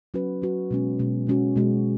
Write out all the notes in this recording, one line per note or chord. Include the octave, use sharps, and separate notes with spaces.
F#3 C#4 F#4 B4
F#3 C#4 F#4 B4
B2 G#3 C#4
B2 G#3 C#4
B2 G#3 C#4 F#4
B2 G#3 C#4 F#4